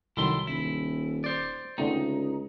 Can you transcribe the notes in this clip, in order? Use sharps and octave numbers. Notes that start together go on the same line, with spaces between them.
C2 D#3 F#3 E4 A4 C6
D#1 E4
C5 D5
C#2 D3 A3 C4 D#4